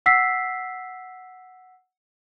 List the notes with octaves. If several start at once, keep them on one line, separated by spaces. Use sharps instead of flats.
F#5 E6 B6 C7